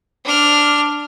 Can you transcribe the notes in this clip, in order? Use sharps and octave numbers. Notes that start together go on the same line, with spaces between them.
D4 F6